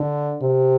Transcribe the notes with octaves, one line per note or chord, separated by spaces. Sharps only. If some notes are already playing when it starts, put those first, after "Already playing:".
Already playing: D3
C3